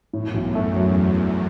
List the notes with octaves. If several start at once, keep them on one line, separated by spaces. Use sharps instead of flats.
F#2 A2
B1
E2 A3
F#3